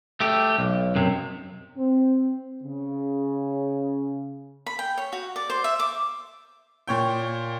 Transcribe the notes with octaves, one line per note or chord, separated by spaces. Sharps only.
A3 G4
B1
F#2 C3
C4
C#3
B5
G5
C#5
F#4
D5
C5
E5
D6
A#2 C#5 G5